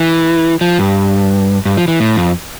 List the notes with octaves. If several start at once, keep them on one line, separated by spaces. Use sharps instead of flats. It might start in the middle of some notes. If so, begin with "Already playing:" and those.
Already playing: E3
F3
G2
G2
F3
E3
A2
F2